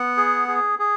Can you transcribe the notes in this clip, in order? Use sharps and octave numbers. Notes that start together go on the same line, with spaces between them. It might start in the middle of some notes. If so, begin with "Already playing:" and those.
Already playing: B3 F#5
G#4
G#4
G#4